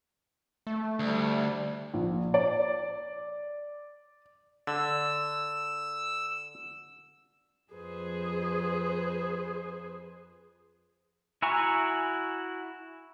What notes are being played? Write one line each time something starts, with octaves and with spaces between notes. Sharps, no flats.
A3
D2 G3
A#1
D5
D3 E6
F2 G#4 B4 C5
E4 F#4 G#5 A#5 C#6